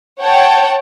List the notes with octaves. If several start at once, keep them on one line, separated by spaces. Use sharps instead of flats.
C#5 F#5 G5 A5